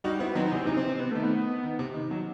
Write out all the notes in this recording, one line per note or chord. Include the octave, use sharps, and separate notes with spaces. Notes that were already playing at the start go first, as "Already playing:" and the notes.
G3 D#4 F#4
B3 C4 E4
D#3 F#3 C4
D#4
C3 E3
C4
C3 E3 D#4
C3 C4
B3
D#3 A3
B3
D#3
C3
D#3
D#3 F#3